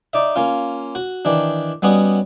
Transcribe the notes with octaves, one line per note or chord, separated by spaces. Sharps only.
D#4 D5 E5
A#3 C#4 F4
F#4
D#3 E3 D4
G3 B3 C#4 F#4 D#5